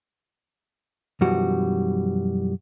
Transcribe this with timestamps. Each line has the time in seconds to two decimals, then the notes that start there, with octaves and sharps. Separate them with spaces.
1.21 F#2 B2 E3 F3 G3 F#4